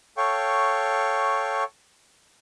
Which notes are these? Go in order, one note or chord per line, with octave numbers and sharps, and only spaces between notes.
A4 C#5 F5 G5 C#6